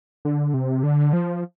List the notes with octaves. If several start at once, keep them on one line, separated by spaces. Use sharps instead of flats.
D3
C3
D3
F3